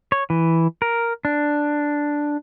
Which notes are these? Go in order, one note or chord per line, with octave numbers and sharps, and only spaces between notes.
C#5
E3
A#4
D4